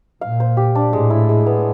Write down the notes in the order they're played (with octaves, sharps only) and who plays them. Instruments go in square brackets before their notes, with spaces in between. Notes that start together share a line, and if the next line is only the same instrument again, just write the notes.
[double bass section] A#2 [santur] F5
[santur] C5
G4
D4
[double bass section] A2 [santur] G#3
[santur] E4
G#3
B3